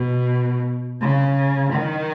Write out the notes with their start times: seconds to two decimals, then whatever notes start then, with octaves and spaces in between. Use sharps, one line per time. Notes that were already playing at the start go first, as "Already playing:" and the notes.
Already playing: B2
1.01 C#3
1.73 D#3